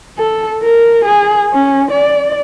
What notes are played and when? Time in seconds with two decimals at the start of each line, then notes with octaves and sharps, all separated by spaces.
0.18 A4
0.63 A#4
1.05 G#4
1.54 C#4
1.91 D5